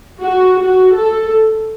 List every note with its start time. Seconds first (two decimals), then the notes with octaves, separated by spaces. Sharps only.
0.21 F#4
0.59 F#4
0.95 A4